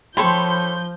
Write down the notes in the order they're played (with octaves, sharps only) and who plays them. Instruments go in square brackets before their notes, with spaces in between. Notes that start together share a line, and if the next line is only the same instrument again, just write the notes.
[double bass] F3 [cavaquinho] A4 C#5 G5 [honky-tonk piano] B5 C6 [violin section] G6